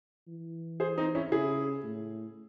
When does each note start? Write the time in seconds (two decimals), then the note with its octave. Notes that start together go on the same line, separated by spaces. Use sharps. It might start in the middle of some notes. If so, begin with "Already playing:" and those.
0.28 E3
0.80 G#4 C5
0.98 C4 D#4
1.15 C#4 E4
1.31 C#3 E4 G#4
1.83 A2